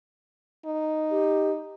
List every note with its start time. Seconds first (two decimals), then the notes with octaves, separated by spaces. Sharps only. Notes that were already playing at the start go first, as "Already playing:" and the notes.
0.66 D#4
1.11 G4